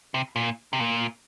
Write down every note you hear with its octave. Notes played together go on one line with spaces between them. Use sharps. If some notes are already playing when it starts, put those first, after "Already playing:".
C3
A#2
C3
A#2